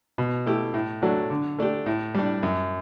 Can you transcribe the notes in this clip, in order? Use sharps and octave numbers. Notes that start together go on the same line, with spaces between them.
B2
A3 E4 G4
A2
F#3 A3 D4 F#4
D3
A3 D4 G4
A2
G3 D4
F#2